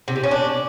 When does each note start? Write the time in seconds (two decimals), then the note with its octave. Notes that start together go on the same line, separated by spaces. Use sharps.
0.08 C3
0.16 G3
0.23 C#4
0.31 D4